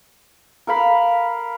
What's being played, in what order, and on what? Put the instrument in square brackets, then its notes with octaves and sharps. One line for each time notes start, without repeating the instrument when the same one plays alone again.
[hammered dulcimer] A#4 F5 B5